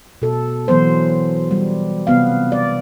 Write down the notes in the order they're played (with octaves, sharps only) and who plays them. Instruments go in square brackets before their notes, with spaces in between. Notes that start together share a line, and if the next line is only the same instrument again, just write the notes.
[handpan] B2 A4
E3 F#3 B3 C5
G3
C3 B3 F5
D5